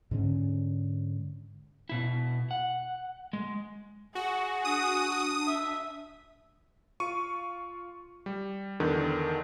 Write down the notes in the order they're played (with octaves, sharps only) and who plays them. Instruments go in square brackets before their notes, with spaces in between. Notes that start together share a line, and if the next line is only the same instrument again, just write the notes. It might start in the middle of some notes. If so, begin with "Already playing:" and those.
[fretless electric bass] G#2 D3 C#4
[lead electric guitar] B2 E4
F#5
G#3
[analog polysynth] F#4 [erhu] G#4
[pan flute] D4 [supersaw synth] D#6
[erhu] E5
[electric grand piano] F4 C#6 D#7
G3
E2 D3 D#3